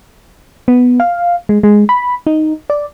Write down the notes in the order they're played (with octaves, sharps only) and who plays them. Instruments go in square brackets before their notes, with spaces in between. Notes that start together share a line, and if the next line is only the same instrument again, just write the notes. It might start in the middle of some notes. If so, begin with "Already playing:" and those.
[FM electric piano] B3
F5
G#3
G#3
B5
D#4
D5